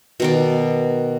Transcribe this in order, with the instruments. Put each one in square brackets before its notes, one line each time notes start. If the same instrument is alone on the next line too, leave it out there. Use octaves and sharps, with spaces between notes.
[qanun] B2 D#3 D5